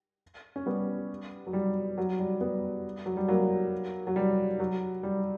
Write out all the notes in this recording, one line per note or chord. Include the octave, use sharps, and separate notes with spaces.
C#4
G3 B3
F#3
G3
F#3
G3
G3 B3
F#3
G3
F#3 A#3
F#3
G3
F#3
G3